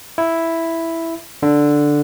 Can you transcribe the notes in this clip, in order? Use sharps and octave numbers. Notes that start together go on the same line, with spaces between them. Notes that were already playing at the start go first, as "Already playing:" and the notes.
E4
D3